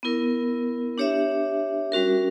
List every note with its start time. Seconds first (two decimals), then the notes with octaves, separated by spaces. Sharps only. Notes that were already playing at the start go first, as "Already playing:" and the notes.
0.03 B3 E4 A#4
0.98 D4 G4 C#5 E5
1.92 G3 C#4 F#4 A#4